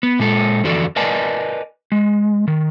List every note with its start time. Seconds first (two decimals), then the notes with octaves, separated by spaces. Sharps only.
0.03 B3
0.19 A#2 G#3 A4
0.64 F2 D3 E3 F#4 A4 D5
0.96 A#4 B4 D5 D#5 G#5 A5
1.92 G#3
2.48 D#3